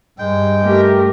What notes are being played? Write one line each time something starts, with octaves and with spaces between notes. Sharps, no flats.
G2 G#3 G5
A3 G4 A#4